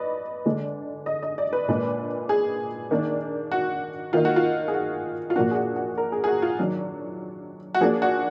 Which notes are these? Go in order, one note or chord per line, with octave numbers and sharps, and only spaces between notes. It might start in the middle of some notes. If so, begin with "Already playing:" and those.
Already playing: D#4 B4 D5 D#5
D3 G#3 D4
D#5
D#5
D5
B4
A#2 G#3 D4
G#4
D#3 A#3 D4
F#4
D#3 A#3 D#4 F4
F#4
F4
G#4
F#4
F4
A#2 F3 A#3 D4 F#4
G#4
F#4
F#4
A#4
G#4
G#4
F#4
F4
D#3 F#3 D4
F#4
F3 A#3 D4 G#4
F#4